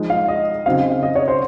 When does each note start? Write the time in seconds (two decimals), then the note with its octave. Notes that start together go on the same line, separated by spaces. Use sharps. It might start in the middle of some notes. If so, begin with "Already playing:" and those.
Already playing: F3 G#3 D#4
0.10 F5
0.28 D#5
0.66 C#3 F#3 C4 D#4 F5
0.90 F5
1.03 D#5
1.15 C#5
1.28 C5